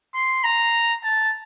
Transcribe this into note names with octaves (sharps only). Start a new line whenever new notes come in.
C6
A#5
A5